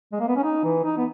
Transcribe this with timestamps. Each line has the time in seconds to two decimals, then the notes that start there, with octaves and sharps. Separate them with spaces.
0.12 G#3
0.20 A#3
0.28 B3
0.36 C#4
0.44 D#4
0.64 E3
0.84 D#4
0.97 B3